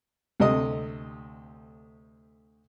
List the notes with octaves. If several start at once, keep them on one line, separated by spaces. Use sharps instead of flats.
D2 C3 A3 D#5 D#6